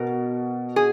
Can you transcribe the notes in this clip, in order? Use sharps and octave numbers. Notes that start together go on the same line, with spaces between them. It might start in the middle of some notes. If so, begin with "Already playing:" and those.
Already playing: B2 A#4
G#4